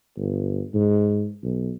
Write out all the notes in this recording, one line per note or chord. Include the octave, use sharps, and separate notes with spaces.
G1
G#2
B1